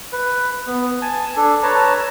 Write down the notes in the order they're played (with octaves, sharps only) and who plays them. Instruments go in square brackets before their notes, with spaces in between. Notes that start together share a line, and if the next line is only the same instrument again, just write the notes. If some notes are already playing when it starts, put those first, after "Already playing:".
[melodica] B4
B3
G#5 A5
D4 A4
B4 C#5 A5 A#5